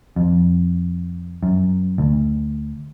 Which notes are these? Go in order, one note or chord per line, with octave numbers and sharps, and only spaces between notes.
F2
F#2
D2